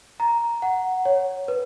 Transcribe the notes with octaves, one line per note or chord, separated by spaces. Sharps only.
A#5
F#5
C#5
B4